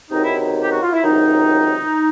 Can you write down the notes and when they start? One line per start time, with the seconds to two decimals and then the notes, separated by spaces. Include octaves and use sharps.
0.11 C#2 C3 D#3 F#3 D#4
0.22 E4
0.35 D#4
0.61 G4
0.71 F#4
0.82 F4
0.92 E4
1.03 C#2 C3 D#3 F#3 D#4